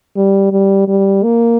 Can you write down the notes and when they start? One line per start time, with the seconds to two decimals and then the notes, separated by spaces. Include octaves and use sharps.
0.17 G3
0.52 G3
0.88 G3
1.23 A#3